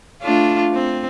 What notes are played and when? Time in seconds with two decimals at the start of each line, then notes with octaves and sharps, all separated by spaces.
0.22 A3 D4 F4
0.74 C4